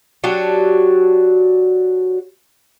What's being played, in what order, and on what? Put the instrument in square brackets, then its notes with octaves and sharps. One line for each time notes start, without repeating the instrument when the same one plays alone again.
[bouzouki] F#3 D4 F#4 G4